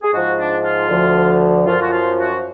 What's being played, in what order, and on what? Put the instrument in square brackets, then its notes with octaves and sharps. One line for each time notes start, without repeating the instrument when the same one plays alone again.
[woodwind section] G#4
G#2 F3 F#4
D4
F4
D2 D3 F3
F#2 F3 F4
F#4
F4
F#4